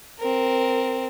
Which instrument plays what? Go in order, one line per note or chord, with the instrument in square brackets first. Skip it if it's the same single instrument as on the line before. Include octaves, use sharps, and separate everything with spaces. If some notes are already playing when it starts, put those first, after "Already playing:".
[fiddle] C4 A#4